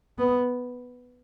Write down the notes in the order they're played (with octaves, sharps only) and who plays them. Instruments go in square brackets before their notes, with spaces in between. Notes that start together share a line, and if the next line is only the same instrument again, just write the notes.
[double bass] B3